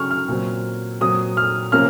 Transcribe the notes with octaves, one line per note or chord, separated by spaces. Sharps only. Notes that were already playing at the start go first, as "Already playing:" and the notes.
Already playing: C#3 F#3 C#4 C#6 F6
F6
A#2 F#3 C4
A#2 F#3 C4 D#6
F6
C3 F3 A#3 C#4 F6